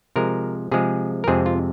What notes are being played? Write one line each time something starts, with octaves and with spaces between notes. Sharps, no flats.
C3 F3 G#3 A#4
C3 F3 G#3 G#4
A#4
F2 C3 G#3 C4 G#4
F4